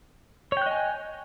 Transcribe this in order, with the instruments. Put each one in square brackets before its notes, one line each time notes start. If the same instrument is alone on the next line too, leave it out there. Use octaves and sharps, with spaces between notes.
[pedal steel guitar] C#5
G5
F#6
D#5
G#5